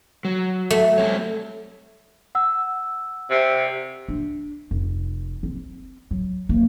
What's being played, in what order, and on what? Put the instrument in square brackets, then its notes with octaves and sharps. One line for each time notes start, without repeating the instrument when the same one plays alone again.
[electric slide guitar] F#3
[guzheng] A3
[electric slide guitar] G3 C4 C#5
[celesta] F#5 E6
[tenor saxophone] C3
[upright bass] D4
F1
C4
F#3
A#3